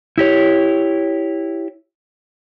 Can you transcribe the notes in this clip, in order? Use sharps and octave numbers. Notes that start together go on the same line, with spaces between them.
E4 G4 C#5